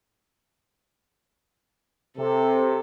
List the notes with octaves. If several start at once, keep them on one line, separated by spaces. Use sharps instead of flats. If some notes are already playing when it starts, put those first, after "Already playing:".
C3 A4